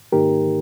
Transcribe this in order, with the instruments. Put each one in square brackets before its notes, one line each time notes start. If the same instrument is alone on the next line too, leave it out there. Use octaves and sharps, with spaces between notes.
[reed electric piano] G#2 D#3 A#3 D#4 G4 A#4